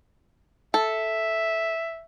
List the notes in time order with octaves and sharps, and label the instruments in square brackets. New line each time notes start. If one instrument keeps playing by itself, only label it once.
[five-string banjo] A4 [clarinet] E5